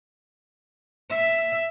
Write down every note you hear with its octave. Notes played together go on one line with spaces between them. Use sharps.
E5